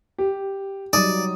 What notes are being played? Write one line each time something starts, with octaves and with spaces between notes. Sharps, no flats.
G4
F#3 G3 D#4 D5 D#6